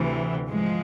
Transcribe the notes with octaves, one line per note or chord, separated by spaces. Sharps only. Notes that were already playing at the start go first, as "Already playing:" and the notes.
Already playing: D2 C3 E3
G#2 F3 G#3